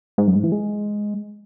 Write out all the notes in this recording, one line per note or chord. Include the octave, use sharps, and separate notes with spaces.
G#2
F#2
G#2
E3
G#3